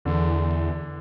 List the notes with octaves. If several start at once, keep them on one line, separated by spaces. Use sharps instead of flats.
E2 D3